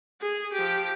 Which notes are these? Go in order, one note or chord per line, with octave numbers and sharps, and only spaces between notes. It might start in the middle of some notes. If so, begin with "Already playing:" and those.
G#4
F3 G4